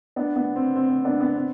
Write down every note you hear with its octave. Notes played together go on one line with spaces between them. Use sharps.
B3 D4
B3
C4
C4
C4
B3 D4
B3
C4